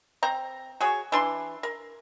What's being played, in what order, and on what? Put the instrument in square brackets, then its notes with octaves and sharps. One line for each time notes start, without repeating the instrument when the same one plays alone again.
[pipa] C4 A#5
F#4 G#4 C#5
E3 D4 C6
A#4